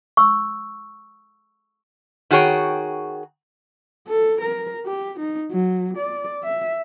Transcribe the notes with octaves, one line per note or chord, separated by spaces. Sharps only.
C#6 E6
D#3 F#4 G#4 C#5 G5
A4
A#4
G4
D#4
F#3
D5
E5